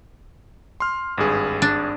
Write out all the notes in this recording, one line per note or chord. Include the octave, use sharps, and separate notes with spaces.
C6 F6
G#1 G2 G#4
D4